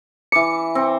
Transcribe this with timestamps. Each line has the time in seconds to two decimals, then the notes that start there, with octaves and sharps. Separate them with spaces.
0.32 E3 D6 C#7
0.75 C4